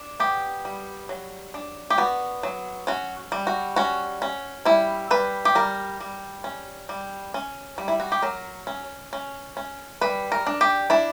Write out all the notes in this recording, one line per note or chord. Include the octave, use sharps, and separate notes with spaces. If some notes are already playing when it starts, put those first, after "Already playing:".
Already playing: D4
B3 G4
G3
F#3
D4
G4
B3 F#4
F#3
C#4 F#4
G3
F#4
C#4 F#4
C#4
G3 E4
G3 B4
G4
G3 A#4
G3
C#4
G3
C#4
G3
E4
F#4
G4
F#3 A#4
C#4
C#4
C#4
G3 B4
A#4
D4
G4
D4 E4